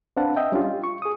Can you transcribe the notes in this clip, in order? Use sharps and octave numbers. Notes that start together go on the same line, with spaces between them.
C4 D4 B4 F5 F#5 A5
D#5 E5 G5
G3 C#4 D4 F4 G4
F4
C#6
G#4 D#6